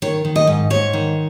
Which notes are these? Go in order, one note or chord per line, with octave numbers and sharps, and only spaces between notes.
D#3 C#5
D#3
D#5
G#2
G#2 C#5
D#3